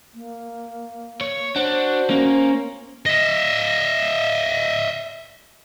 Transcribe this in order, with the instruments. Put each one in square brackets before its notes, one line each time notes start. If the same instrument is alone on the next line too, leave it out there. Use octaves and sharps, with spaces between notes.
[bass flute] A#3
[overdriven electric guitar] C#5
[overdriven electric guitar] D4 [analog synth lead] F#4 [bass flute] C5
[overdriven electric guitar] A#3 [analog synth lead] C#4
[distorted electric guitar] D#5 E5